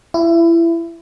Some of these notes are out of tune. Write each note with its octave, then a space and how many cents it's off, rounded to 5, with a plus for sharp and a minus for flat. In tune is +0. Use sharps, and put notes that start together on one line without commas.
E4 +25